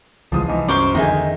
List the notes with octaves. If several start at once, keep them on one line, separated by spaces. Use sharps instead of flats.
C#2 E3 F3 G#3 D#6
C2 E3 F3 D#4
F#2 C5 C#6 D6 G7
F2 D3 D#3 G#3 D#4 E5 G#5